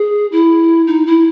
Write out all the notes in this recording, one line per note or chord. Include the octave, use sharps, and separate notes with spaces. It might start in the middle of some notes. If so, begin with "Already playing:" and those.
Already playing: G#4
E4
D#4
E4